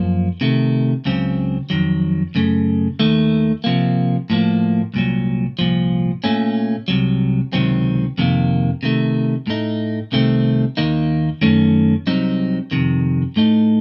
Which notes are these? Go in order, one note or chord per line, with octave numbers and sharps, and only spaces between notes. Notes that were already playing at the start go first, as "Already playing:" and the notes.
Already playing: F#2 F3 A#3
C3 D#3 A3
C#2 C#3 F#3 C4
F2 D#3 F#3
F#2 C#3 A3
D#2 D#3 A3
C3 F3 A#3
A2 F3 A#3
C2 A#2 F#3
C2 A#2 F3
A#2 A3 C#4
C2 C3 F#3
C#2 C3 D#3 F#3 C4
F2 C3 D#3 A#3
C3 D#3 A3
A2 A3 D#4
C2 C3 D#3 A3 C4
D#2 D#3 A#3 D#4
F#2 D#3 A3 C#4
C2 C3 F#3 C4 D#4
F2 C3 D#3
A2 A3 D#4